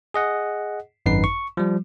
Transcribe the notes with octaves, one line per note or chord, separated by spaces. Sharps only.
G#4 D#5 F#5
G#1 F#2 D#4 B4 C7
C#6
F3 G3